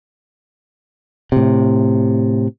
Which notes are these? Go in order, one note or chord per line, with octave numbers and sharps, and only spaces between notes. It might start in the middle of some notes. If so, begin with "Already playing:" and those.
A2 C3